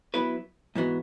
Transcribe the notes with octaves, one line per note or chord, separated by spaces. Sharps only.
F#3 B3 E4 B4
G#2 E3 G#3 B3 F#4